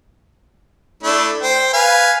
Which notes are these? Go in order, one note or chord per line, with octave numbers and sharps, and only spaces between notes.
A3 D4 E4
C5 G5
B4 F5 G#5